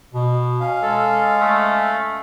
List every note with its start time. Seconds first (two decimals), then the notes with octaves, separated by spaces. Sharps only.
0.14 B2
0.60 C#4 F5
0.82 G#3 A4
1.40 A3